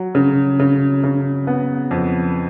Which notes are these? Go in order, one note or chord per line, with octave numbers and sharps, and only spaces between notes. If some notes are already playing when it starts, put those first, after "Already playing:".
Already playing: F#3
C#3
C#3
C#3
B3
F2